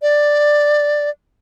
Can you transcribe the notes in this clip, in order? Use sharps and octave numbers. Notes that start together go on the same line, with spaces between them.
D5